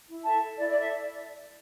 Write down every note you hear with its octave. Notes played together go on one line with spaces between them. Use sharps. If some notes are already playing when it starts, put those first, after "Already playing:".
E4
A4 E5 A5
A4
E4 D5
D5
A4
E5